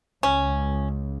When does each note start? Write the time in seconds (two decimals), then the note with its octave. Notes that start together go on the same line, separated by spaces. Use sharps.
0.23 C#2 C#4